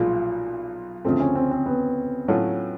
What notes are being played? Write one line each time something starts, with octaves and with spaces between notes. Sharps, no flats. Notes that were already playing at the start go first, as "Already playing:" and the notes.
Already playing: B1 A#2 F3 G#3 F4
D2 C#3 F3 A3 C4
C#4
C4
C4
B3
A2 F#3 A3 C#4 F4